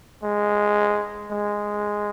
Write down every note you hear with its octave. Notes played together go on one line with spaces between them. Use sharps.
G#3
G#3